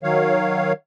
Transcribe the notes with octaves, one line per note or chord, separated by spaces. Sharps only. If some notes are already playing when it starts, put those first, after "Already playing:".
D#3 F#3 C#5 F5